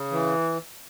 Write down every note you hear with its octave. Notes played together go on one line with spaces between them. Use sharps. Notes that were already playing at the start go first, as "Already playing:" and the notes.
Already playing: C#3
E3